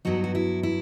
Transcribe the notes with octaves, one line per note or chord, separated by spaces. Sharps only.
G2 F#3 B3 D#4 F#4
F#4
E4
E4